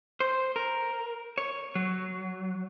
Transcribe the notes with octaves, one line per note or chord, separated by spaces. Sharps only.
C5
A#4
C#5
F#3